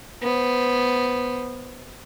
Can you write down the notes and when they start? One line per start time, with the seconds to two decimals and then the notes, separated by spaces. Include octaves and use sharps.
0.22 B3 C5